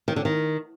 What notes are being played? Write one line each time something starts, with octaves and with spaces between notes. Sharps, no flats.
D#3
D3
D#3